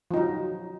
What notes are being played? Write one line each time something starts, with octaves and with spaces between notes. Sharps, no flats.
F3 F#3 D#4